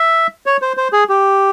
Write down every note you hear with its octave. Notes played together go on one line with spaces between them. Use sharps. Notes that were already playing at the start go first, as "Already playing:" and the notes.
Already playing: E5
C#5
C5
C5
G#4
G4